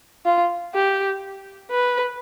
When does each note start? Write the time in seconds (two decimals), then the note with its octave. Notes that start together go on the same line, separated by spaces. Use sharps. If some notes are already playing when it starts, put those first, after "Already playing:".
0.25 F4
0.74 G4
1.71 B4